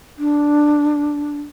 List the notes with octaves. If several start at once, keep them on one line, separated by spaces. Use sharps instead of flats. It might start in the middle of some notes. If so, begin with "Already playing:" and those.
D4